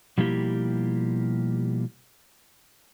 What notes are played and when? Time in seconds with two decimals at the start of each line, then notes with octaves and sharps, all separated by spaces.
0.18 B2 F3 G3 A#3 E4 G4